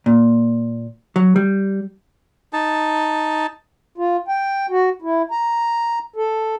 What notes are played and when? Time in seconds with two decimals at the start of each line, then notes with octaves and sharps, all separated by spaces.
0.06 A#2
1.16 F#3
1.36 G3
2.53 D#4 A5
3.98 F4
4.28 G5
4.70 F#4
5.02 E4
5.31 A#5
6.16 A4